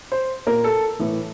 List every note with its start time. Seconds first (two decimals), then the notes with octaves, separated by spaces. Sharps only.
0.12 C5
0.47 A#2 A#4
0.64 A4
0.99 A2 E3